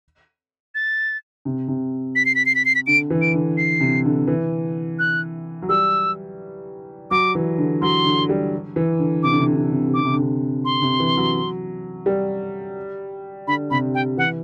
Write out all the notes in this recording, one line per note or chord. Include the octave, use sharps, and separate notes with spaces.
A6
C3
C3
B6
C7
B6
C7
B6
C7
B6
D3 D7
E3
D7
D3
C7
C3
D3
E3
F#6
F#3
G3 E6
F#3 D6
E3
D3
F#3 C6
D3
G3
E3
D3
C3 D6
D3
C3
D3
C3
D3
C3
D3
C3
D3 D6
C3
D3
C3
C6
C3
E3
F#3
G3
D3 B5
C3 B5
G5
E3 F#5